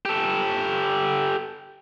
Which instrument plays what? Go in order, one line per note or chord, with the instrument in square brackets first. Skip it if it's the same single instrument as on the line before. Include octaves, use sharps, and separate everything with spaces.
[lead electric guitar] G4 A4